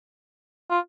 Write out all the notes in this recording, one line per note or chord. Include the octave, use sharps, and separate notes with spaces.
F4